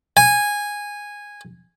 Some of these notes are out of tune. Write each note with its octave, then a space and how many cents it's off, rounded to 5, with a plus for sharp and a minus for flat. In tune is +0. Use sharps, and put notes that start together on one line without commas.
G#5 -10